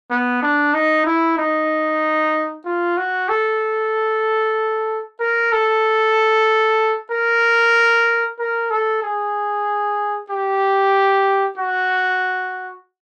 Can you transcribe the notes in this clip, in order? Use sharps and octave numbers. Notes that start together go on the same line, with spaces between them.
B3
D4
D#4
E4
D#4
F4
F#4
A4
A#4
A4
A#4
A#4
A4
G#4
G4
F#4